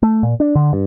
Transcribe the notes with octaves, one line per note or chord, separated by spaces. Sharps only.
A3
A#2
D4
D3
G2